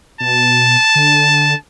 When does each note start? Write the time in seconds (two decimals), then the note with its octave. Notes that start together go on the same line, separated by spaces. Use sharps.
0.21 B2 A5
0.95 D3